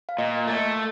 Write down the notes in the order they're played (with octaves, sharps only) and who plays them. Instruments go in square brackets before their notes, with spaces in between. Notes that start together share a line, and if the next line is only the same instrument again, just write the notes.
[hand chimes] F5
[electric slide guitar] A#2 [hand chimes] D#5
[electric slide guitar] A3